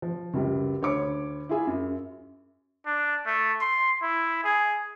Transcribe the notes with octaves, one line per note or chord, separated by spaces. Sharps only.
F3
C#2 F#2 G3
D2 C#5 B5 D6 C#7
E4 F4 G#4 E5
F#2
D4
A3
C6
E4
G#4